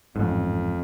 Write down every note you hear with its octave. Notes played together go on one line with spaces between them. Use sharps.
A1 F2 G#2